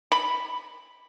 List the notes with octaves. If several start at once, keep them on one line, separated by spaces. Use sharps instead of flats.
B5